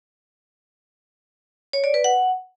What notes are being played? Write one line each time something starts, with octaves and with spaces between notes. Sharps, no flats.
C#5
D5
B4
F#5